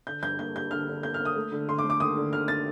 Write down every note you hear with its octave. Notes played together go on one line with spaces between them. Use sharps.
D3 G6
G2 G6
A#3 G6
G3 G6
D3 F6
D3
A#3 G6
F6
A#3
D#6
A3
D3
D3 C6
D6
A3
D6
D#2 D#6
D3
D#2 F6
A6